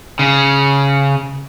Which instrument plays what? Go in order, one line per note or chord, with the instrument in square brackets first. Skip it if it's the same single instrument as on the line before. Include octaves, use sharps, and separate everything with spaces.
[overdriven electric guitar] C#3